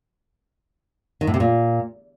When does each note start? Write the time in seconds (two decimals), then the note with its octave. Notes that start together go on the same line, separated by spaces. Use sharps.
1.21 D#3
1.27 A2
1.34 C3
1.40 A#2